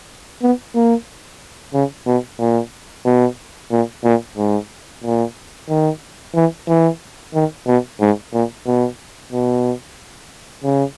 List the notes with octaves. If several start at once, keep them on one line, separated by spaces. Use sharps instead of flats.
B3
A#3
C#3
B2
A#2
B2
A#2
A#2
G#2
A#2
D#3
E3
E3
D#3
B2
G#2
A#2
B2
B2
C#3